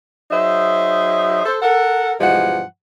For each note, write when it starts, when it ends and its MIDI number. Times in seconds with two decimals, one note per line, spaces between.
0.31 1.45 54
0.31 1.45 63
0.31 1.45 68
0.31 1.45 72
0.31 1.45 76
1.45 1.57 69
1.45 1.57 72
1.62 2.13 69
1.62 2.13 70
1.62 2.13 78
2.20 2.62 43
2.20 2.62 47
2.20 2.62 52
2.20 2.62 53
2.20 2.62 56
2.20 2.62 78